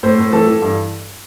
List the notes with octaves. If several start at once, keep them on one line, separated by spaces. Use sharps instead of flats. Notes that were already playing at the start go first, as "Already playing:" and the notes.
A2 C5
A2
E3 A4
E3
G2